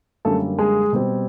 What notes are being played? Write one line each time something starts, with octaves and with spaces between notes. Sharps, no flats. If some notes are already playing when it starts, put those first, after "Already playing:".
F#2 D3 G3 A3 A#3 A4
G#3 G#4
B2 G3 C4